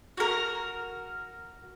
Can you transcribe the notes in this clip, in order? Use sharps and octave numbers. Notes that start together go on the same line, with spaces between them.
F#4 A#4